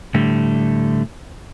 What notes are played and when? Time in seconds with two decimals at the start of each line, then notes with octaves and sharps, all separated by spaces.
0.14 A2 D3 G3 A3